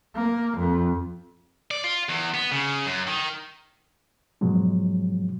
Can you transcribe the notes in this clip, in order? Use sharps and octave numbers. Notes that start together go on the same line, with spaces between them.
A#3
F2
D5
F4
E2
B3
C#3
F#2
D#3
G#2 B2 F3 F#3 G#3